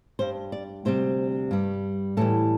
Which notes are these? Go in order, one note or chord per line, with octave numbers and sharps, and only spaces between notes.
G2 G3 C5
D5
D2 C3 G3 C5
G2 G3
A2 E3 G3 A4